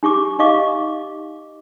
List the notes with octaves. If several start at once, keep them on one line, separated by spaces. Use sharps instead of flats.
D#4 G4 C#6 D6
D#4 G4 D#5 F5 C#6 D6